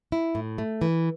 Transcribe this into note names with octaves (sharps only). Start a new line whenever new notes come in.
E4
A2
A3
E3